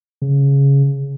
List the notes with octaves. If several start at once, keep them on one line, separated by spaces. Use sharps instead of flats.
C#3